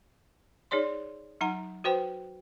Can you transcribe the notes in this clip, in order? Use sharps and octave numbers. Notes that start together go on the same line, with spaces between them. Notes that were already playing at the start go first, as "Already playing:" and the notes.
D#4 G#4 C#5 D5 C6
F#3 D#4 F#5 A#5
F#4 B4 C5 G5